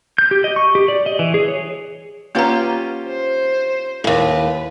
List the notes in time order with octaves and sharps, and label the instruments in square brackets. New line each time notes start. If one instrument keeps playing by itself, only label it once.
[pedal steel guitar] G6
G4
D#5
C#6
G4
D5
D#5
E3
G#4
C#5
[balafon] A#3 B4 A#5 [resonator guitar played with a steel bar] C#4 F4 G4
[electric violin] C5
[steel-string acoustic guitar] D#2 G#2 [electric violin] B4